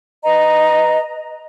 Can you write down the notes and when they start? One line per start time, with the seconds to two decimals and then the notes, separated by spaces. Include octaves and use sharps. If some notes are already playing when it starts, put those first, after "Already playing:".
0.23 B4 D#5 A#5